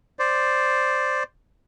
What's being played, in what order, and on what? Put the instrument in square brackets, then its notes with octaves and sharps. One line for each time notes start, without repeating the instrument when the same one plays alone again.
[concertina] C5 D5